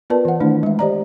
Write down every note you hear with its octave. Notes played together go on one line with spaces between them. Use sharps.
B3 F4 A#4 B4 D5 A5
E3 F#5
D#3 A3 D4 E4
G#3 E5
G4 C5 D5 D#5 A#5